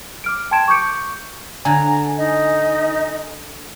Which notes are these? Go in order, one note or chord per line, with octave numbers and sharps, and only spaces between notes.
D6 F6 D7
G5 A5 C6 G#6 D7 E7
C#6 D6 G6 C#7 D7
D3 G#5 A#5
D#4 D#5